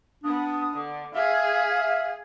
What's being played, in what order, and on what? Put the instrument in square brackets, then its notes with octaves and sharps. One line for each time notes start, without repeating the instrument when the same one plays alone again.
[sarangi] B3 [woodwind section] D4 D#6
[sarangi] D3
[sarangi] G#4 [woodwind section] E5 F5